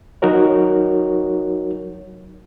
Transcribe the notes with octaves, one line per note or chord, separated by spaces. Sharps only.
F#3 D#4 F#4 A#4 C#5